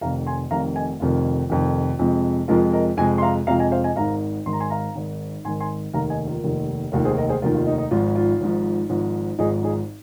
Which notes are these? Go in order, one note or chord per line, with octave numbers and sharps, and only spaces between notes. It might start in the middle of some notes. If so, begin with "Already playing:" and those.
F1 F2 C3 D#3 F5 A#5
G#5 C6
F1 F2 C3 D#3 F5 A#5
D#5 G#5
F1 F2 C3 D#3 F4
F1 F2 C3 D#3
F2 C3 F3 G#3
F2 C3 F3 G#3 F4 A#4
A#4 D#5
F2 C3 F3 G#3 D#5 G#5
C6
F5 A#5
F2 C3 F3 G#3 F5 A#5
D#5 G#5
C5 F5
D#5 G#5
G#1 G#2 D#3 F5 A#5
G#1 G#2 D#3 C6
A#5
G#5 C6
F5 A#5
G#1 G#2 D#3
G#1 G#2 D#3 G#5 C6
G#5 C6
F1 D#2 D#3 F5 A#5
D#5 G#5
F4 A#4
F1 D#2 D#3
F1 D#2 D#3 F4 A#4
G#4 C5
A#4 D#5
G#4 C5
F1 D#2 D#3 F4 A#4
F4
D#4
D#4
G#1 G#2 F3 F4
F4
G#1 G#2 F3
G#1 G#2 F3
G#1 G#2 F3 D#4 G#4
D#4 G#4